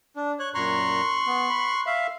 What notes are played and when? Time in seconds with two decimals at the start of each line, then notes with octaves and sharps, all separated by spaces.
0.16 D4
0.40 C#5 F#6
0.55 F#2 A#2 A#5 C6 C#6 F#6
1.26 B3
1.49 B5
1.86 E5 F5